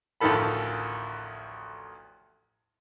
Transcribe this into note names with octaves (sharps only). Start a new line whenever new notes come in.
A1 D2 D#3 F3 A4 B5